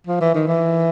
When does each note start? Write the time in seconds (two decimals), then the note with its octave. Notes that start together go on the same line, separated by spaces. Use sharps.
0.07 F3
0.21 E3
0.35 D#3
0.48 E3